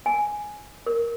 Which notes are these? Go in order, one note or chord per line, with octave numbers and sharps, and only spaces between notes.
G#5
A#4